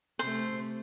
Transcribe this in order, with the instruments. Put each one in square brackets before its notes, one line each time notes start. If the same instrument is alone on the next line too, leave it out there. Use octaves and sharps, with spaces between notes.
[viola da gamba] C3 A3 [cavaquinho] C5